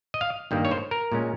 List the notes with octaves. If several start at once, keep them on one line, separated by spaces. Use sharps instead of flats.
D#5
F5
G2 D#3 G3 A#3
C#5
C5
A#4
A#2 G#3 C#4